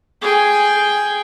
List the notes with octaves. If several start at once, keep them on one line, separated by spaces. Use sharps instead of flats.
G#4 G5